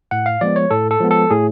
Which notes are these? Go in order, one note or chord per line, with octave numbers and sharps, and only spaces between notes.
A2 F#5
F5
F3 G#3 B3 D5
C#5
A2 A4
A4
F3 G#3 B3
A4
A2 G#4